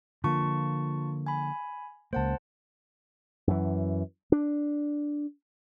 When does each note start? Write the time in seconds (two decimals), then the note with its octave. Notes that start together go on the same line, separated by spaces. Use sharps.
0.24 D3 F3 A#3 F4 A5 C#6
1.26 G#5 B5
2.13 C#2 A#3 C5 F#5 A5
3.47 F#2 E3
4.32 D4